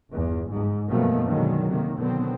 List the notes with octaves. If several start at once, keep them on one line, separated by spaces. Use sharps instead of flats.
G1 E2
G#2
F#2 B2 D#3 F3 A3 A#3
B2 D3 D#3 F#3 G#3
C3 D#3 A#3
B2 D3 D#3 F#3 B3 C4